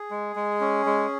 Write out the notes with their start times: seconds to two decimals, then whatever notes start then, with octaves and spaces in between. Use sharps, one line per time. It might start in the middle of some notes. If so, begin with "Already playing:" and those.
Already playing: G#4
0.11 G#3
0.36 G#3
0.61 C#4
0.86 G#3